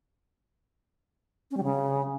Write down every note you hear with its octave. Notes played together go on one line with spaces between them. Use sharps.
C#4
G3
C#3